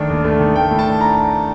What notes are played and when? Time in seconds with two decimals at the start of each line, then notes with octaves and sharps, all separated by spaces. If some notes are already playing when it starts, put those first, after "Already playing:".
Already playing: D#3 A3 D4
0.10 D#2
0.24 A3
0.39 D#3
0.55 A3 G5
0.71 A2
0.79 A5
0.86 D4
1.01 A#5